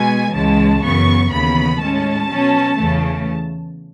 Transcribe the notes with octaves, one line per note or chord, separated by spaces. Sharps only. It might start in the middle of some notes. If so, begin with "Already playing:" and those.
Already playing: B2 G#3 B3 G#5
C#2 C#3 E3 G#3 A5
F#2 C#3 E3 B3 C#6
D#2 C#3 E3 B3 B5
A2 G#3 C#4 A5
B2 F#3 C#4
E2 C#3 E3 A3